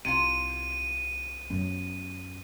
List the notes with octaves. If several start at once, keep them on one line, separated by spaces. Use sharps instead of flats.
C2 C3 F4 D#7
F#2 B3